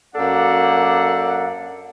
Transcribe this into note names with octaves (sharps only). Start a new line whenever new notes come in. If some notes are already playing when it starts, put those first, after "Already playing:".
F#2 A#3 D4 A4 F#5